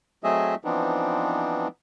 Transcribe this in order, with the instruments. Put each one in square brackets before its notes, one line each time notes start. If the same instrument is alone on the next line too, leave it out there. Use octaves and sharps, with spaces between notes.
[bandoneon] F#3 A3 C4 G#4 D#5 E5
E3 F3 B3 C4 D4 D#4